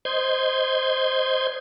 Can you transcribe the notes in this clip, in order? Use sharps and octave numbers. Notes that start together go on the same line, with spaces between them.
C5 D#5 C6 G6 G#6